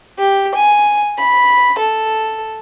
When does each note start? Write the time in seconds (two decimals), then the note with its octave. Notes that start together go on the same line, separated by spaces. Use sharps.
0.18 G4
0.56 G#5
1.18 B5
1.78 A4